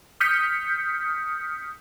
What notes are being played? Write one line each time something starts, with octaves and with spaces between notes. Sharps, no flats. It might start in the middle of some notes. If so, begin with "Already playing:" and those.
D#6 F6 G6 B6 C#7